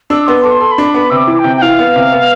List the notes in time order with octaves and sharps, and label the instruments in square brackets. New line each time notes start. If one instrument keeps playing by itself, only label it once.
[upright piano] D4 [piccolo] E6
[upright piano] B3 [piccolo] C6
[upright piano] A4 [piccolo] D6
[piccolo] C6
[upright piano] A4
[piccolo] B5
[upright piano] D4
[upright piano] B3 [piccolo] B5
[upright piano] C3 [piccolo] E6
[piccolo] D6
[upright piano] E3
[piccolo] G5
[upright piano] C3
[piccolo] G5
[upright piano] E3 [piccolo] F5
[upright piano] B3
C3
B3